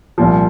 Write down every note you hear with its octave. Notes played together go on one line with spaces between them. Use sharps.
C2 A#2 F3